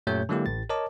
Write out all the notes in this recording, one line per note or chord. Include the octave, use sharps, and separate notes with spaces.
F#2 A#2 A3 G4 C#5 G6
D3 F#3 G#3 A#3 E4 G4
A1 A2 A6
A#4 C#5 D#5 A5 D6